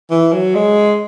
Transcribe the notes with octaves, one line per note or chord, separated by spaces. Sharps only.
E3
F#3
G#3